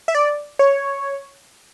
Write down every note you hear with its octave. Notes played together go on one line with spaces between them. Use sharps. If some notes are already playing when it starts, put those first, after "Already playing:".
E5
D5
C#5